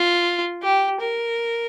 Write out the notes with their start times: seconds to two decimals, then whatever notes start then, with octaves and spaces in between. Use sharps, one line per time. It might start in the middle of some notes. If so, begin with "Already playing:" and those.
Already playing: F4
0.62 G4
1.00 A#4